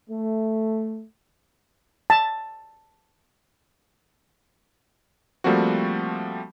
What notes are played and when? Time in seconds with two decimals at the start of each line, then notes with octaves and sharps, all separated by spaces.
0.10 A3
2.10 A5
5.44 F3 G3 A3 A#3 C4 F#4